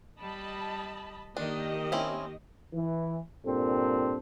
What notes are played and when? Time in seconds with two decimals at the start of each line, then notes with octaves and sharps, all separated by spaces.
0.20 G3 D#5 A5 B5
1.37 D#3 A#3 D4 G4 D#5
1.92 C4 C#4 E4
2.73 E3
3.45 G2 A#2 C4 A4